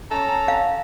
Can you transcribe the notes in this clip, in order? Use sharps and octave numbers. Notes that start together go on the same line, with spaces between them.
C#4 A4 A#5
F5